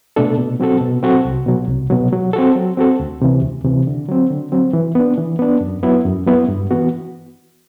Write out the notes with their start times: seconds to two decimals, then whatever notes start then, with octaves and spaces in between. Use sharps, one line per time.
0.16 B2 A3 D4 A4
0.37 B2
0.60 F#3 C4 F#4 A4
0.81 B2
1.03 F#3 C4 F#4 A4
1.25 C2
1.46 B2 F#3
1.68 C2
1.90 B2 F#3
2.13 F#3
2.33 C4 F#4 A4
2.55 F#3
2.77 C4 F#4 A4
3.00 D2
3.22 C3 E3
3.42 D2
3.65 C3 E3
3.87 D3
4.08 F#3 C4
4.30 D3
4.52 F#3 C4
4.73 E3
4.95 B3 D4
5.17 E3
5.39 B3 D4
5.61 F#2
5.83 F#3 B3 E4
6.05 F#2
6.27 F#3 B3 E4
6.48 G2
6.71 E3 B3 F#4